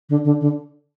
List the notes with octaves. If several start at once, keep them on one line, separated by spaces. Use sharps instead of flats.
D3
D3
D3